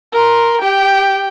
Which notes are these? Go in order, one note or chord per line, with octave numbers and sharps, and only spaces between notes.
A#4 C6
G4 G5